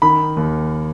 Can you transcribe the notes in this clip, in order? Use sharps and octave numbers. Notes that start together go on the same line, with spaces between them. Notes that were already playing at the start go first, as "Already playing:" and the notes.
D#3 B5
D#2